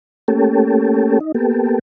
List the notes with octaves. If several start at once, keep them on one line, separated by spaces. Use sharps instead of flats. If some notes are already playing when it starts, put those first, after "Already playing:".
A3 A#3 C#4 G4 A4
D#4
A#3 B3 G4 A4